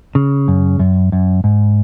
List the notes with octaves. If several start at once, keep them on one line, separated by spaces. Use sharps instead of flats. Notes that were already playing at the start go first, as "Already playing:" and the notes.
C#3
F#2
F#2
F#2
G#2